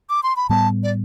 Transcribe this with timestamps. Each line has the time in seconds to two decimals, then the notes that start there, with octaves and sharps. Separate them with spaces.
0.10 D6
0.23 C6
0.36 B5
0.49 A2 G3 B3 A5
0.83 D5